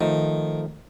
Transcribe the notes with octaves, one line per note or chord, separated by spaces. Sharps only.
D#3 F3 A3 D#4